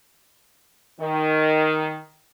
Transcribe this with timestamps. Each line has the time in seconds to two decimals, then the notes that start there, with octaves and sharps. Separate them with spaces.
1.00 D#3